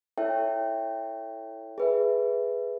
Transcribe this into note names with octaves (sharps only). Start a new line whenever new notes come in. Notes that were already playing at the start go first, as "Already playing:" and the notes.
E4 A4 C#5 E5 G5
G#4 B4 E5